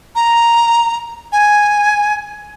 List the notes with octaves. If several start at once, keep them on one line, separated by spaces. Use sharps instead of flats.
A#5
G#5